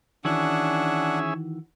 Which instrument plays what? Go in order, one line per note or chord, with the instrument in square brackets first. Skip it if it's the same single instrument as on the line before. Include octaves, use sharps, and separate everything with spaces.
[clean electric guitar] D#3 E3 F#4 [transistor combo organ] C#4 G#4 E5 [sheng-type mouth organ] D4 F#5